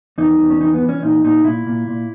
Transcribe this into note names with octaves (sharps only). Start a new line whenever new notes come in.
E2 D#4
E2
C#4
E3 D#4
B3
E3
C#4
A#2 D#4
A#2 D#4
A#2 E4
A#2
A#2